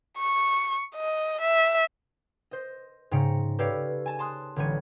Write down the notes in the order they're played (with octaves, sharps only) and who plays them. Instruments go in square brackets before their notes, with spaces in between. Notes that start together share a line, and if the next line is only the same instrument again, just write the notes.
[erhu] C#6
D#5
E5
[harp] C5 D#5
G#2 C#3 G5 A#5 C#7
G4 A4 B4 C#5 D5 F5
G#5 A5
A5 C6 D#6 F#6
A1 D3 G3 C#5 D#7